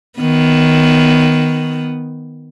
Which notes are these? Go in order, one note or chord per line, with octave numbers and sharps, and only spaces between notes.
D#3 B3